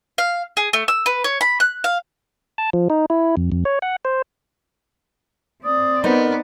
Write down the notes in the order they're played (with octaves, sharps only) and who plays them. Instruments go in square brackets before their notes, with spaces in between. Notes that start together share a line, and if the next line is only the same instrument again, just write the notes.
[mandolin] F5
G#4
A3
E6
B4
C#5
B5
F#6
F5
[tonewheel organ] A5
F3
D#4
E4
F2
F2
C#5
F#5
C5
[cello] C4 D5 [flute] D#6
[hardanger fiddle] B3 [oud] D#4 C5 [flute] A#4